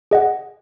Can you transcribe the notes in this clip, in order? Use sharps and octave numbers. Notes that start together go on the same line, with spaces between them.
G#4 D#5 F#5